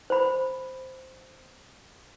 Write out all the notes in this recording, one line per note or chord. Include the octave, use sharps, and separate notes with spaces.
C5 B5